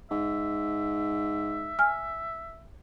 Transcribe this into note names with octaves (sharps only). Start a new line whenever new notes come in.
G#2 E5
G#5 F6